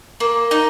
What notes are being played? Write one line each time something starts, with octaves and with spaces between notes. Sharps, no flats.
A#3
D#4